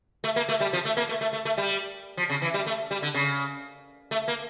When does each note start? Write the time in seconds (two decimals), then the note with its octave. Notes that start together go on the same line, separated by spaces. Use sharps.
0.24 A3
0.36 A#3
0.49 A3
0.60 G3
0.73 F3
0.85 A3
0.97 A#3
1.09 A3
1.21 A3
1.33 A3
1.45 A3
1.57 G3
2.17 F3
2.30 C#3
2.42 E3
2.54 G3
2.66 A3
2.91 G3
3.02 D3
3.14 C#3
4.11 A3
4.28 A#3